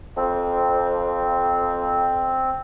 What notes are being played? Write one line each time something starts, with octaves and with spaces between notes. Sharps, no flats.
F2 C4